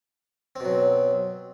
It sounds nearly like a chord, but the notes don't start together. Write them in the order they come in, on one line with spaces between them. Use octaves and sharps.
C4 B2 F#3